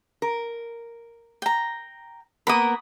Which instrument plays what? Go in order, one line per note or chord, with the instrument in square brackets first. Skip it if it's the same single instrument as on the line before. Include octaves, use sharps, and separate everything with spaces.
[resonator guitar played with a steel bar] A#4
[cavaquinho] G5 A#5
[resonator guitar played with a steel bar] A#3 B3 A#4 [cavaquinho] B5 D#6